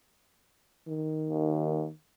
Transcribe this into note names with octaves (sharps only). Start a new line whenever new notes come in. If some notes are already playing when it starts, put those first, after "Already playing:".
D#3
D#2